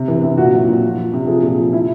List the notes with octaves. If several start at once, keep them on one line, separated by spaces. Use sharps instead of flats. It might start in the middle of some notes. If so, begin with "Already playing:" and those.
Already playing: C3
E3
C3
A#2 F#4
F#3
A#2
F3
F3
C3
F3 G#4
A#2
F3
C3 E4